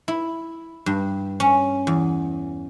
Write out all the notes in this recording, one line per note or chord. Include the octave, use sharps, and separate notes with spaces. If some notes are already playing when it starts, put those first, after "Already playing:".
E4
G2
C#4
E2